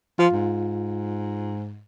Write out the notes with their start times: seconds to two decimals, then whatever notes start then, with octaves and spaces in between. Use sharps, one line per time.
0.19 F3 F4
0.33 G#2